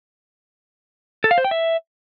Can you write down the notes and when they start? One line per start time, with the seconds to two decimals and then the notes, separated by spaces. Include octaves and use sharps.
1.24 A4
1.31 F5
1.38 C5
1.44 G5
1.51 E5